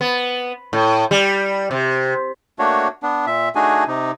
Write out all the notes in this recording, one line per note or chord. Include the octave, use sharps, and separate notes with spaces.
B3
A2
G3
C3
A3 A#3 D4 F#4 C#5
B3 D4
A#2 E5
A3 D4 D#4 F#4 G#4 G#5
C3 D#4